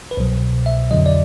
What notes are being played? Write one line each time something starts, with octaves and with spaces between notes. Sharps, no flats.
B4
C2 B2 F#3 C5
E5
F2 D3 F#3 D#5
D5